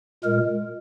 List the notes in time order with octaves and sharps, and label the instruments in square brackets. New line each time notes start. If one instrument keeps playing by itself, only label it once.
[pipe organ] A#2 G#3 A#4